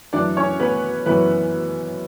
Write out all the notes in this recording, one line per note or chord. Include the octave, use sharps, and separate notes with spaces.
F#2 E3 D4 D5
C#4 C#5
B3 B4
F#2 E3 B3 B4